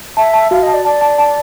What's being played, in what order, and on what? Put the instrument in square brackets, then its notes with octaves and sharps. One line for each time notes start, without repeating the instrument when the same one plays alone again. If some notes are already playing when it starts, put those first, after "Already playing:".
[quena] E5 [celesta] A5
[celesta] A5
[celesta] F#4 [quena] F5
[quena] D#5 [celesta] A5
[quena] D5
[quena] D5 [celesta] A5
[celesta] A5
A5